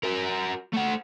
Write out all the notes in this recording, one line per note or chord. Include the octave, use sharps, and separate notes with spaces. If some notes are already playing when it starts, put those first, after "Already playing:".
F#4 A#4
A3 F#5